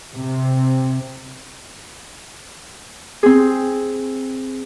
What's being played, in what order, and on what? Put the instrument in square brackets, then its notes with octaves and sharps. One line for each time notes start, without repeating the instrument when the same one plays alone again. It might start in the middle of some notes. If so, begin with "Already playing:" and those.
[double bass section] C3
[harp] C4 G#4